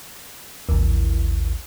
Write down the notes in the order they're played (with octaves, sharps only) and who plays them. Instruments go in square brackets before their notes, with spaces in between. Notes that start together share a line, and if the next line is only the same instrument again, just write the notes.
[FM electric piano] A1 D#2